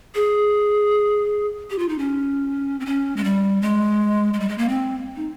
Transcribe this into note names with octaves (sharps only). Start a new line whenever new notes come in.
G#4
G4
F4
D#4
C#4
C4
C#4
G#3
G3
G#3
G#3
G3
G#3
A#3
C4
D#4